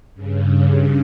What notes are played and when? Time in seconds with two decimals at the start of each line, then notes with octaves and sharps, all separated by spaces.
0.14 G2 C#3